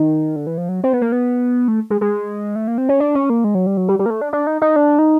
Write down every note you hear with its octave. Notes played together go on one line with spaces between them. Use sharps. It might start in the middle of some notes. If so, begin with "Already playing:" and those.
Already playing: D#3
D3
E3
F3
F#3
C4
B3
A#3
B3
A3
G#3
G#3
A3
A#3
C4
C#4
D4
C#4
A#3
G#3
F#3
G3
F#3
G3
G3
A#3
A3
D4
D4
D#4
D#4
D4
D#4